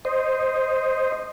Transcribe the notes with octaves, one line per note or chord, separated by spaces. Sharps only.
C5 D#5